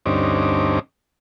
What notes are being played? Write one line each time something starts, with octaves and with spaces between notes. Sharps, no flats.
D2 G2 C4 C#4 D#4 D6